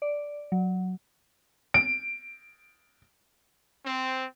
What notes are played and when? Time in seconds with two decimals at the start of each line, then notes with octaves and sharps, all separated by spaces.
0.02 D5
0.52 F#3
1.74 D7
3.84 C4